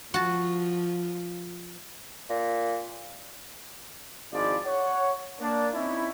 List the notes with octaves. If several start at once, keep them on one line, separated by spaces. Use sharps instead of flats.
F3 F#4 A5
A#2
G#1 F3 G#3 E4 F4 D5
C#5 F#5
A#3 D4
C4 C#4 D#4 E4